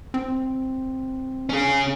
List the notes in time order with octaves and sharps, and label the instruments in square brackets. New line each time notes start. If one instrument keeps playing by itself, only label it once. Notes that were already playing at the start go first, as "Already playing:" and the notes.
[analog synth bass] C4
[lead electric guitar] C#4 G#4